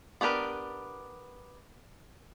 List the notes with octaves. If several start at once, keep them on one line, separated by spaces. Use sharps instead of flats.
B3 D4 G4 A#4 B4